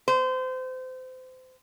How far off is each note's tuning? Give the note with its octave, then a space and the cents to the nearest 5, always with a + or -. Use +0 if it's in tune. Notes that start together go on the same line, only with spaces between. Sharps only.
C5 -30